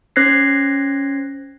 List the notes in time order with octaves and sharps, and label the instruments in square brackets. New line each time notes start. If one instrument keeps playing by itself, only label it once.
[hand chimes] C#4 C5 F#6 G#6 A#6 C7